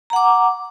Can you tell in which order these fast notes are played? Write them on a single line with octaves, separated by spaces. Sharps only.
A#5 F#5 D6